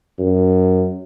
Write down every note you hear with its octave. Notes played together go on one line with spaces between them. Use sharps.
F#2